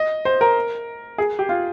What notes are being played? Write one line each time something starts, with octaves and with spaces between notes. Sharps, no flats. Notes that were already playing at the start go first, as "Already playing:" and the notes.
Already playing: D#5
C5
A#4
G#4
G4
F4